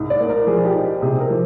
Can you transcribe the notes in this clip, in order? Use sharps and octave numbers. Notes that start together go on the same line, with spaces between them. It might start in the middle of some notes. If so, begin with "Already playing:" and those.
Already playing: C2 G#2
D5
A#3
A#4
F3 G#4
G4
D#4
G4
C3 G#4
A#4
F3